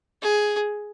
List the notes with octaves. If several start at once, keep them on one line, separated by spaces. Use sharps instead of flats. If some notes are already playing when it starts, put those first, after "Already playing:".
G#4